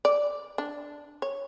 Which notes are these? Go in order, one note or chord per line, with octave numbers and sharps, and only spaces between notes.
D5
D4
C#5